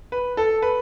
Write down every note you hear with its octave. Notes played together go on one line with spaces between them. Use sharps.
B4
A4
B4